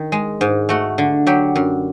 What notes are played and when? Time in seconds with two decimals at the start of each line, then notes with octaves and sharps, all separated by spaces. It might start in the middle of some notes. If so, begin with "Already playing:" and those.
Already playing: D#3
0.12 G#3
0.41 G#2
0.69 A3 F#4
0.98 D3
1.27 F#3 G4
1.55 F#2